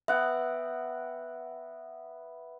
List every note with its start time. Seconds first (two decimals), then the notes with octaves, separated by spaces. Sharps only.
0.08 B3 E5 F#5 G5